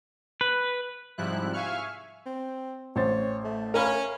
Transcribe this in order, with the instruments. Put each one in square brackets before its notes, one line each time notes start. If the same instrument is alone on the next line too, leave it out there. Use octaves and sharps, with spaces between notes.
[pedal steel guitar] B4
[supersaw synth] G#2 C3 F3 G3 E4 F#6
E5 F5 G#5 C#6 F6
[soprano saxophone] C4
[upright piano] A1 C5 A6 [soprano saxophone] C#5
[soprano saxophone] A3
[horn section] C#4 [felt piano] A#4 F5 B5